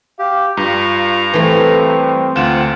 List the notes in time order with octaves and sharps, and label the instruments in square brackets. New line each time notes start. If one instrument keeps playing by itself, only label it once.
[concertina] G4 [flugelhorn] F5
[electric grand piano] G2 [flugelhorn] F4 [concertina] A#5
[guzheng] E3 A3 [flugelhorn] C4
[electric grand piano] D2 E7 [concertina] F4 F#5 [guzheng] G5